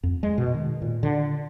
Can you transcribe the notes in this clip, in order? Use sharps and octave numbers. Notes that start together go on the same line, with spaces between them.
F2
G#3
B2
D#3
A#2
D3